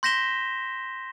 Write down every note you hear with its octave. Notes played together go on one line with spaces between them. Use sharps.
C6 G6 A#6 B6 E7 G7